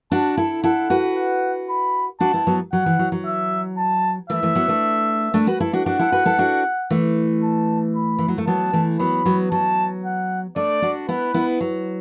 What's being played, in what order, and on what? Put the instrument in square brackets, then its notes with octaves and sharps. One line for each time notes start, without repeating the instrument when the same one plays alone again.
[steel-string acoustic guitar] D4 F#4 [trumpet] A5
[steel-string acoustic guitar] E4 A4
[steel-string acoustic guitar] E4 A4 [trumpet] F#5
[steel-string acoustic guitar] F#4 B4
[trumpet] F#5
B5
[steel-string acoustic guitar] D4 F#4 [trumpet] A5
[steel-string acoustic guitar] B3 E4
F#3 B3
[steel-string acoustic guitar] F#3 [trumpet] F#5
[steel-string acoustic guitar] E3
F#3
F#3
[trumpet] E5
A5
[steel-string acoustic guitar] E3 A3 [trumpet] E5
[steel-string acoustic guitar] E3 A3
F#3 B3
A3 D4
A3 D4
F#4 B4
E4 A4
D4 F#4
[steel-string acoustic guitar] D4 F#4 [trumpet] F#5
[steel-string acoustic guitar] E4 A4
F#4 B4
E4 A4
D4 F#4
E3 A3
[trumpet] A5
B5
[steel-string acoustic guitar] E3
F#3
A3
[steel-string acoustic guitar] F#3 B3 [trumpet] A5
[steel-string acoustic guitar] E3 A3
[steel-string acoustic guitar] F#3 B3 [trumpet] B5
[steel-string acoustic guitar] F#3 B3
[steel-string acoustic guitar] F#3 [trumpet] A5
[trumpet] F#5
[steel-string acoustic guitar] A3 D4 [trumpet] D5
[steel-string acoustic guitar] D4 F#4
[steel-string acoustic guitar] B3 E4 [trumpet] B4
[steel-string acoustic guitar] B3 E4
F#3